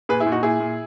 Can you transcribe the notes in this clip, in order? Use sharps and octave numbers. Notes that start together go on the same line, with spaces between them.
A#2 G#4 B4
E4 G#4
A#2
D#4 F#4
A#2 E4 G#4
A#2